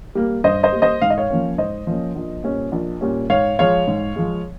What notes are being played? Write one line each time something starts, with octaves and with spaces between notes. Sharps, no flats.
G3 A#3
G2 C5 D#5
C5 D#5
G3 A#3
C5 D#5
G#2 F5
D#5
C#5 F5
F3 A#3 C#4
G#2 C5 D#5
F3 A#3 C#4
A#1
A#2 G3 C#4
A#1
A#2 G3 C#4
G#2 C#5 F5
F3 G#3 C#5 F5
G#2
F3 G#3